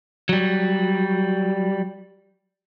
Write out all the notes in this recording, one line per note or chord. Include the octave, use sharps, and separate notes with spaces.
F#3 G3